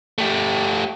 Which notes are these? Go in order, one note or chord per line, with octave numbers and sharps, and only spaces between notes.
A3 G4